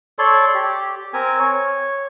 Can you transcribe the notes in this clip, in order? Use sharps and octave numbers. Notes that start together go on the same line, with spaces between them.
A4 C#5 D5 C6
G4
C4 A#4 G#5
C#5